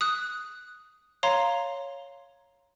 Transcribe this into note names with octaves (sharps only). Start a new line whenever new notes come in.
D#6 F#6
C#5 F5 A#5 C6